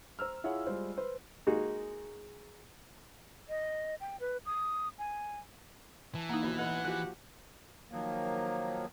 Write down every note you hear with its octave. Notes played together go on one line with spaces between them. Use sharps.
C5 A#5 E6 F6
E4 F4 G#4 C#5 F#5
G3 G#3 F4 C5
B4 C5
G#3 A#3 D#4 F#4 G#4
D#5
G5
B4
D#6
G#5
E3 A5
A#3 D#4 F5 F#5
D#2 B2 F3
A1 B3 D#5 F#5
F3 F#4 G4 F#6
D#3 F3 F#3 A#3